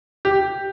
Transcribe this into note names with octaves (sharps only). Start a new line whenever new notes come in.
G4